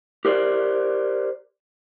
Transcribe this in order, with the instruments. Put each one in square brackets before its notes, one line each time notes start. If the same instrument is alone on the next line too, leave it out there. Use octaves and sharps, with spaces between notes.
[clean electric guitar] G4 A#4 C5 D5